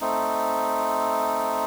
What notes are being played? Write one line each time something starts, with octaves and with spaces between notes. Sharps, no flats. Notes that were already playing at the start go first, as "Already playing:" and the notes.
A3 C4 D#4